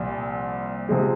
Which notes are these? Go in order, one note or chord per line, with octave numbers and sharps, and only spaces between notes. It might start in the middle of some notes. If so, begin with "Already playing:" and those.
Already playing: C2 A#2 F3
C3 F3 G#3